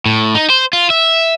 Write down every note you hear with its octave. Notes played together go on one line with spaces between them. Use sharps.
A2
D#4
C5
F4
E5